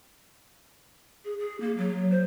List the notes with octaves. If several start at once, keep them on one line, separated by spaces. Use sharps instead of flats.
G#4
G#4
A#3
F#3
C5